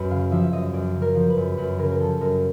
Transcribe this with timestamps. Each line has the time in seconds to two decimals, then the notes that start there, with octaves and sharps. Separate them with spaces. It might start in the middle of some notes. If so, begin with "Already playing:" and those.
Already playing: F#2 B4
0.11 C#3 F5
0.31 F3 E5
0.44 E5
0.53 F#2 D#5
0.73 F#2 D5
0.95 C#3
1.02 A#4
1.15 F3
1.29 B4
1.37 F#2
1.58 F#2 B4
1.79 C#3 A#4
1.91 A#4
1.99 F3 A4
2.21 F#2 A#4